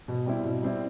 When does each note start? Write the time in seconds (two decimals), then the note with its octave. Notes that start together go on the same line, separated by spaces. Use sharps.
0.08 B2
0.26 G3 C4 E4
0.44 B2
0.62 G3 C4 E4